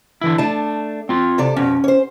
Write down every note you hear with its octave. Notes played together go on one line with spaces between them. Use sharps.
D3 E3 E4
A3 D4 A5
C4 F4
C3 A4 D5
F2 B2 C#4
C5 C#5